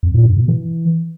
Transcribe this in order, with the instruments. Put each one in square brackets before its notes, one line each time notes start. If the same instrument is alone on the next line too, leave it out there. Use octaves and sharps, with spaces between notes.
[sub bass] F2
A#2
G2
B2
E3